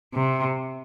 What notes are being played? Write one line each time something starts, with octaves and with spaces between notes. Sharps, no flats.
C3